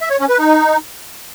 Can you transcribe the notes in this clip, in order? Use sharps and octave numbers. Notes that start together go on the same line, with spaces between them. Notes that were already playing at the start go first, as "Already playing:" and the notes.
E5
C#5
C#4
B4
D#4